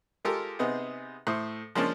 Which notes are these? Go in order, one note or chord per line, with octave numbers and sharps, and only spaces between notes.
G#3 F4 G4 A4 A#4
C3 B3 D#4 G#4 C5
A2 C5 E5 D#6
F3 G#3 A#3 C#4 D4